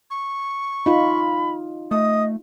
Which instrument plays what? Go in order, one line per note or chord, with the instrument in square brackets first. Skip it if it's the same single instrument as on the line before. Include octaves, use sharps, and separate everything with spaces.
[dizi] C#6
[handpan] D#4 F4 [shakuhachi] B5
[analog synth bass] A3 [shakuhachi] D#5 [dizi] D#6